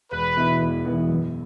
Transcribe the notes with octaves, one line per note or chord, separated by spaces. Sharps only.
E1 B4
E2 B2 B3 E4
E1
E2 B2 B3 E4
F#2